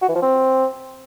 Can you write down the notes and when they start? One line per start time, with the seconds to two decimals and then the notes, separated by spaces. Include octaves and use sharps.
0.02 F#4
0.09 E3
0.15 F3
0.22 C4